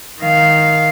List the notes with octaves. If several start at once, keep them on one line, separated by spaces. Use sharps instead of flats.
D#3 F5